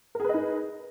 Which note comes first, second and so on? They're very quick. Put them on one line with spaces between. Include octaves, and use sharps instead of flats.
A#4 G#4 B4 D#5 D#4